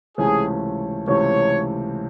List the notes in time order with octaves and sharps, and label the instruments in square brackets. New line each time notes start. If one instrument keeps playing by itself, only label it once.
[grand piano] C#2 C3 E3 A3 C#4 [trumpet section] G#4
[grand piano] C#2 C3 E3 A3 C#4 [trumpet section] C#5